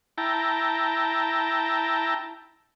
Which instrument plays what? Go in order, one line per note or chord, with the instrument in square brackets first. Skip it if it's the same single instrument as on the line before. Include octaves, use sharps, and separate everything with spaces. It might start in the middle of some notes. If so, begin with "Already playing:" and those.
[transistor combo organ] E4 G5 A5 A#5